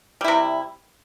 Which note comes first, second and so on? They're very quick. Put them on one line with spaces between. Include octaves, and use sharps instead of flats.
G3 E4 C3